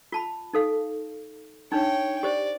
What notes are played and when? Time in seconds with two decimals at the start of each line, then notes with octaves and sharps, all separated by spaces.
0.12 F4 A5 B5
0.53 D#4 A4 F5
1.72 D4 D#4 C#5 G5
2.23 G4 C5 D5